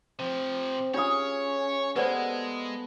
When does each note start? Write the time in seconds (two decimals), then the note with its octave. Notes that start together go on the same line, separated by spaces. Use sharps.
0.19 C3 F3 C4
0.94 C#4 D4 F4 G#4 C#5 F5 D#6
1.96 G#3 B3 A4 B4 C5 D5